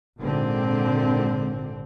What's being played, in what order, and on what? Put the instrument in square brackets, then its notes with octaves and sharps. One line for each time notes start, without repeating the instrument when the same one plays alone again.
[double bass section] G#1 A#2 D3 C4